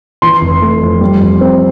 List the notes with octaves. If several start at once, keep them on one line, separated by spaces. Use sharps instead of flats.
E3 C6
F1
A3
F2
G3
F2
C4